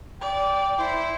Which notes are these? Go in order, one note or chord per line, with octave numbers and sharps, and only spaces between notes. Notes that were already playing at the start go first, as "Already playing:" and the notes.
D5 G5
E4 C5